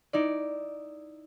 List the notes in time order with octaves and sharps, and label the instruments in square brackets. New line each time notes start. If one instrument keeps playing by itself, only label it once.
[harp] D#4 E4 D5